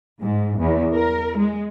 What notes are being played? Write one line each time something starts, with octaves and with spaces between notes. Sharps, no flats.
G#2
E2
A#4
G#3